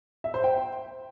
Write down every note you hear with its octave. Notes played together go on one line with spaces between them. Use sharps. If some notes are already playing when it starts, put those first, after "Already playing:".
E5
C5
G5